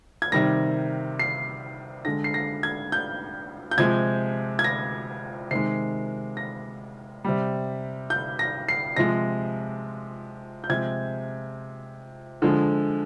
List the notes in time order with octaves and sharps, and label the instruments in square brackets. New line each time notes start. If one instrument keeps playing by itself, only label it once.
[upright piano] G#6
C3 D#3 G3 A#6
C7
D3 G#3 A#6
C7
A#6
G#6
G6
G6
C3 F3 G#3 G#6
G#6
A#6
C3 D#3 G#3 C7
A#6
C3 G3
G6
A#6
C7
C3 F3 G#3 A#6
G6
C3 F3 G#3 G#6
D3 F3 G#3